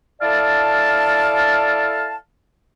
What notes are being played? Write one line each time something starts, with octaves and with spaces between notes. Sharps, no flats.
E4 A4 D5 F5 A5